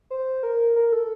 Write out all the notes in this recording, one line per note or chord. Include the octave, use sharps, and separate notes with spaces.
C5
A#4
A#4
A4